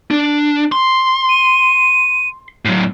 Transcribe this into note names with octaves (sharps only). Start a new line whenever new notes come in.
D4
C6
D#7
A2 F#3